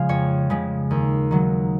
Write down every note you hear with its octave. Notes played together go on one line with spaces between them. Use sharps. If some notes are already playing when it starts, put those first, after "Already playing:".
Already playing: C#3 F3 G#3 F5 G#5
F2 C#5
C#3 F3 G#3
D#2
D#3 F#3